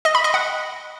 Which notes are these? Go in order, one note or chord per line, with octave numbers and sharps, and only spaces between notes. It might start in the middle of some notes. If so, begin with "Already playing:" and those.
D#5
B5
D#5
F#5